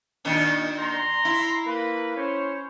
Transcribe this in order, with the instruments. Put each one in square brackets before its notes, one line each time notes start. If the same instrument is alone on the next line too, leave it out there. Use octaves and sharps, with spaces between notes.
[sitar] A#2 D#3 D4
[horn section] A#5 C6
[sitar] E4
[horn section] A#3 B4
C#4 C5 C#5